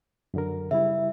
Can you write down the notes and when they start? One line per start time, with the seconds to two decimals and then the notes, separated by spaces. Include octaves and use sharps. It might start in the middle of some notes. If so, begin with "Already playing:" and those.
0.34 F#2 D3 A#4
0.71 C#3 G3 E4 E5